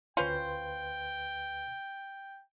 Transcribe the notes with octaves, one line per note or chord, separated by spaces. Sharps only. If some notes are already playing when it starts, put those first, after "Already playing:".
D2 C#4 F4 B4 C5 G5 C6